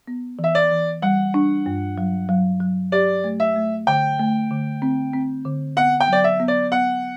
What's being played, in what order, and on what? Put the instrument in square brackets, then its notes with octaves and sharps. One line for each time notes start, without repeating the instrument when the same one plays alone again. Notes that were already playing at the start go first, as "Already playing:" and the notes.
[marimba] B3
[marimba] E3 [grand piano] E5
[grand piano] D5
[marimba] E3
[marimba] G3 [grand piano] F#5
[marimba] D4
G2
F#3
F#3
F#3
[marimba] G4 [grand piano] D5
[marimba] A3
[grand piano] E5
[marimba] A3
[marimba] D3 [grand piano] G5
[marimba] A3
D3
C4
C4
D3
[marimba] B3 [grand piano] F#5
[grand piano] G5
[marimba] F#3 [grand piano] D5
[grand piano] E5
[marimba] B3
[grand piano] D5
[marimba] B3 [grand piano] F#5